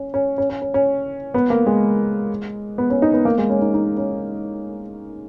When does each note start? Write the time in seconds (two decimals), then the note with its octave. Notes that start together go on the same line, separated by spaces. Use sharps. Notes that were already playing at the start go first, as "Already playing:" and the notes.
Already playing: C#4
0.14 C#4
0.38 C#4
0.50 C#4
0.62 C#4
0.74 C#4
1.34 B3
1.50 A#3
1.66 G#3
2.78 B3
2.90 C#4
3.02 D#4
3.13 B3
3.25 A#3
3.38 G#3
3.50 C#4
3.62 D#4
3.74 D#4
3.97 C#4